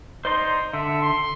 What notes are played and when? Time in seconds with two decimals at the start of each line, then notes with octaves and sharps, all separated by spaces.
0.25 D#4 C5 D5 C6
0.73 D3 E5
1.02 C6